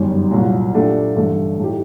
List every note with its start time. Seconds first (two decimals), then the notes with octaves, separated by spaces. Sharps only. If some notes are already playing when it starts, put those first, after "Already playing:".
Already playing: G1 F#2 D#3 G3
0.31 C2 A#2 F#3
0.73 A#2 A3 D4 G4
1.16 A1 G2 D3 A3
1.59 A2 A3 D#4 G4